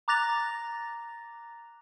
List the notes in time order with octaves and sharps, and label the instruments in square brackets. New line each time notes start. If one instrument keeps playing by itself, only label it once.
[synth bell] A#5 D6 F#6 A6 A#6 F7